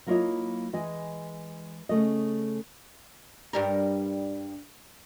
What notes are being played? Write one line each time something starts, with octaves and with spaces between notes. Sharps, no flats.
F#3 A#3 E4 F4 C#5 D#5
E3 G#3 D#5 G#5
C#3 A3 D#5
G2 G3 A#4